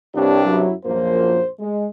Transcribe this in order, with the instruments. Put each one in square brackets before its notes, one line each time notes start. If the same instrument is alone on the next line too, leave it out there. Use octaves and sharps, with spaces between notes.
[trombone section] C2 G2 D4 [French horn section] C3 G4 C#5
[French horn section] F#2 F#3 E4
[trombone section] A#1 C5 [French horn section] F#2 F3 A#3
[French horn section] G#3